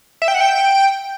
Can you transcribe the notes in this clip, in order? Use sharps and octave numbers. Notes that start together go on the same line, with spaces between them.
E5
G5
F#5
G5